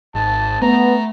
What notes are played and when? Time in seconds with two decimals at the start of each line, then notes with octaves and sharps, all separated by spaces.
0.15 G#1 A5
0.62 A3 B3 A#5